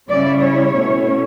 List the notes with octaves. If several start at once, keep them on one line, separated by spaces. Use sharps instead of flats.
C#3 G3 C#4 E4 D5
C#5
B2 A3 C#4 E4